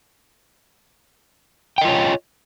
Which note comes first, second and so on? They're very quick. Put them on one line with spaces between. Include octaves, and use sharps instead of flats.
G5 D#5 F4 C#5